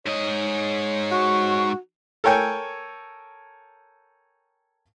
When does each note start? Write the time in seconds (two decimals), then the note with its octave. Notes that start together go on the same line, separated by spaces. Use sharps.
0.06 G#2 C#5 D#5
1.11 F#4 C#6
2.24 A4 A#4 C#5 G5 G#5